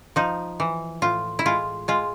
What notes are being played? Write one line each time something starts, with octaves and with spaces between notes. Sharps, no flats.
F3 D#4
E3
A2 F4
E4
G#3 F4
G#3 F4